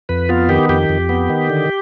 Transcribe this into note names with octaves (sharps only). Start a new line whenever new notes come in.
F2 B4
B3 F4
D#3 G4
F2 G4
F2
B3
D#3
D3